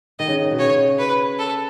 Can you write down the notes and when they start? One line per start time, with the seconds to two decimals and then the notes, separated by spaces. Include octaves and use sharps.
0.19 D#3 D#5
0.28 C#3
0.37 D#3
0.51 B2
0.59 C#3 C#5
0.99 B4
1.39 A4